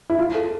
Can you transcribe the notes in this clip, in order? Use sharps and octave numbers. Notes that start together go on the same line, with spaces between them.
E4
F4
A4